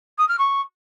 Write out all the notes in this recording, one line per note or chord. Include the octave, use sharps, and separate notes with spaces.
D#6
F6
C#6